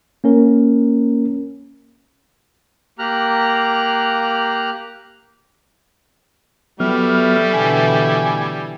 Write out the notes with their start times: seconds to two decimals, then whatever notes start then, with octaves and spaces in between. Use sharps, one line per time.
0.24 A#3 C#4 A#4
2.99 A#3 G4 A#5 F6 F#6
6.80 F#3 G3 A3 B3 E4 F6
7.53 B2 D3 E3 G#5